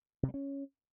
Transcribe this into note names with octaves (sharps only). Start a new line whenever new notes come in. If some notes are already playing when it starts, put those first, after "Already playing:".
C3
G3
C#4